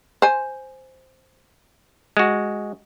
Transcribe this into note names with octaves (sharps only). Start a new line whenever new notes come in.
C5 G#5
G#3 F#4